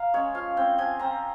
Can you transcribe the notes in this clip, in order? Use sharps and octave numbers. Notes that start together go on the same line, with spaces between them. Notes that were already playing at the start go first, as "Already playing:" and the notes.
Already playing: F5 A#5
G#3 C#4 C#5
F3 F5
C4 G5
F3 G#5
C4 A#5